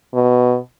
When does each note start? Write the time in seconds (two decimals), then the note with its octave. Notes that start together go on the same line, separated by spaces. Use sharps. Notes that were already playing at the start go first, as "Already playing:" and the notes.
0.14 B2